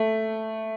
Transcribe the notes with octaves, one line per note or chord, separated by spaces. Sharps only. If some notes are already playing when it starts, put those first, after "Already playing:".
Already playing: A3